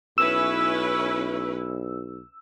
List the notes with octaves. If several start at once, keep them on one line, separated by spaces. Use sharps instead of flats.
B1 C#4 E4 B4 E6